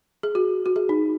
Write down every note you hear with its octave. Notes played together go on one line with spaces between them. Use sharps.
G#4
F#4
F#4
G#4
D#4